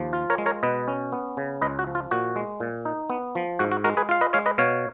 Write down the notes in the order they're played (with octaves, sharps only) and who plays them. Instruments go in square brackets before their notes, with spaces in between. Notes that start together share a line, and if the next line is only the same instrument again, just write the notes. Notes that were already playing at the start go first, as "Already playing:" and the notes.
Already playing: [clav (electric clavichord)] D#2 F3
F4
A#4 C#5
G#3
A#4 C#5
B2 B4 D#5
C#4
B3
C#3
C#2 B4 D#5
F#4
F3
F4
A#2 F#4
G#3
A#2
D#4
B3
F3
G#2 F#4
F#4
G#3 F#4 A#4
G#4 B4
F4 F5
B4 D#5
G#3 C#5 F5
B4 D#5
B2 C#5 F5